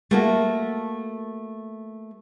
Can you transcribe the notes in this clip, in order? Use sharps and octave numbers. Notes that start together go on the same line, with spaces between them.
A3 A#3 F#4